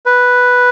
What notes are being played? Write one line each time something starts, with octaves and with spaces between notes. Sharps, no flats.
B4